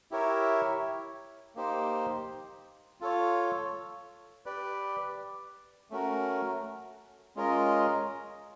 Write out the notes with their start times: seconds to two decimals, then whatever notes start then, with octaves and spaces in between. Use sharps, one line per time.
0.11 E4 G4 A#4 C#5 E5
1.55 A#3 D#4 G4 C5
3.00 F4 A4 C#5
4.46 G4 B4 D5
5.90 A3 C#4 F#4 A#4
7.36 G#3 C#4 F4 A#4 D#5